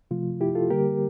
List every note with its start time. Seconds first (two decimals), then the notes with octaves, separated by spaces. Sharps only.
0.11 C3 F3 A3 F4
0.41 E4 G4
0.55 F4 A4
0.70 D3 G3 A#3 G4 A#4